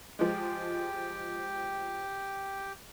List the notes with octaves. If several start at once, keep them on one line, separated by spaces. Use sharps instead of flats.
F3 G#3 G4 G5